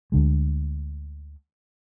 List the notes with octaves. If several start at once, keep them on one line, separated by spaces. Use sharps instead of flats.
D2 D3 G#3